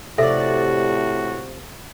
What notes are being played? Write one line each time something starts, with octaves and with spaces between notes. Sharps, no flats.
A2 C3 F3 F#4 A4 D5 E5